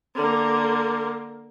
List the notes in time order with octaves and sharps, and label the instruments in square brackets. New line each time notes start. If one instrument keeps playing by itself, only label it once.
[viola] D3 A#3